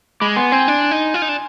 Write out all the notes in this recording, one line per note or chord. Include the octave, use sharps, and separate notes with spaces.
G#3 B5 D6
B3 G#5 C6
C4 G#5 C6
D4
D#4
F4
D#4
D4